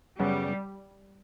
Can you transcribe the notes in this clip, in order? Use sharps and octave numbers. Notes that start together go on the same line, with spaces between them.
F#2 C#3 F#3 G3 B3